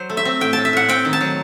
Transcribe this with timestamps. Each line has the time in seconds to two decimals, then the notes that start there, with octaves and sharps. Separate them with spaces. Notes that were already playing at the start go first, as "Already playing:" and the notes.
Already playing: F#3 C5
0.10 A3
0.17 E5
0.25 C4
0.41 A2 G5
0.53 A2 A5
0.65 E5
0.73 A2 F#5
0.89 C4 G5
1.05 D#3
1.13 A5
1.21 F#3